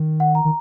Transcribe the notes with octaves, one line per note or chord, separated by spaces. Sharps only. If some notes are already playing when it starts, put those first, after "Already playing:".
Already playing: D#3
F#5
A#5
D#3